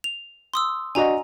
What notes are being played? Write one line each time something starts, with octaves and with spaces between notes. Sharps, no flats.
F7
C6 D#6 E6
D4 F#4 D#5 G#5 A#5